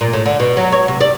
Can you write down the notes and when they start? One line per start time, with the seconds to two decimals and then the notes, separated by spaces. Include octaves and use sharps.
0.01 A#2
0.13 A2
0.26 D3
0.40 B2
0.57 F#3
0.72 C#5
0.88 C3
1.01 D5